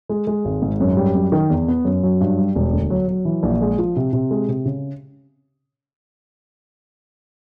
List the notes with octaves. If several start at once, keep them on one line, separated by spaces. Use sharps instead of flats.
G#3
G#3
G#1
G#2
F#2
G3
F#2
D#3
E2
B3
F#2
F#3
G2
G3
E1
D2
F#3
F#3
E3
A#1
G#3
F3
C3
C3
G#3
C3
C#3